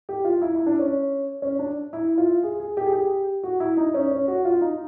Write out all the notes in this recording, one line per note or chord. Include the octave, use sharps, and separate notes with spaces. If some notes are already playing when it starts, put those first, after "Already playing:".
G4
F4
E4
E4
D4
C#4
C#4
D4
E4
F4
G#4
G#4
G4
G#4
G4
F#4
E4
D#4
C#4
C#4
F#4
F4
D#4